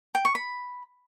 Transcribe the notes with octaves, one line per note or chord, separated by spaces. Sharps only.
G5
C#6
B5